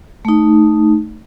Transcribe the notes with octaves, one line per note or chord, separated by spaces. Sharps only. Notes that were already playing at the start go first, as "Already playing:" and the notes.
A3 D#4